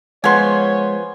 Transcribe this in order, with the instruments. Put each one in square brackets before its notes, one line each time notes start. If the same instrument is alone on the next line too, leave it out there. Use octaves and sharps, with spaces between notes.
[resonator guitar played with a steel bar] F3 B3 [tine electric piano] G#3 [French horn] C#5 [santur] G#5 C6